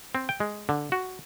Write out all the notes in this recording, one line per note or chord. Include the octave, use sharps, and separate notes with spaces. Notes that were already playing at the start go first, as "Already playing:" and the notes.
C4
G5
G#3
D3
F#4